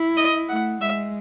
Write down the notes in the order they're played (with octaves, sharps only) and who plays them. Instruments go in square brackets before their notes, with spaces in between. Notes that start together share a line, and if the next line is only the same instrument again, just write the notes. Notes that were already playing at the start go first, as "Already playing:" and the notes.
Already playing: [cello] E4
[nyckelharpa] D#5
[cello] A3 [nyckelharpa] F#5
[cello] G#3 [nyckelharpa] E5